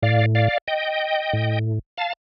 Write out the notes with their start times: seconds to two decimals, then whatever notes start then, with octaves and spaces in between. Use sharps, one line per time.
0.03 A2 D5 F5
0.35 D5 F5
0.68 D#5 G5
1.33 A2
1.98 F5 A5